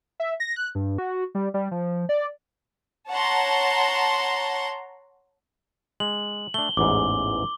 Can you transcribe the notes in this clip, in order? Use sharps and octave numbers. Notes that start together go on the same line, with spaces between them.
E5
A#6
F#6
G2
F#4
G3
G3
F3
D5
C#5 F#5 A5 A#5 C6
G#3 F#7
A3 D4 G7
A1 E2 G#2 D6